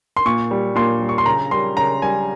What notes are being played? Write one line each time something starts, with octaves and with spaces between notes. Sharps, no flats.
C6
A#2 C#6
G3
A#2 C6
G3
C#6
C6
C#3 A#5
G3 C6
C#3 A#5
G3 G#5